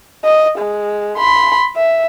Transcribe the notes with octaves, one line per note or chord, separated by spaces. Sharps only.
D#5
G#3
B5 C6
E5